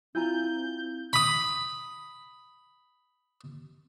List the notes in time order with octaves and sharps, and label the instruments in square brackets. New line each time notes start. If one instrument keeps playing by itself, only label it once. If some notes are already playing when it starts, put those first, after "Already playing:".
[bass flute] C4 [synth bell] E4 [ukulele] F4 G#5 A#5 [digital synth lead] G6
[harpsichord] B5 D#6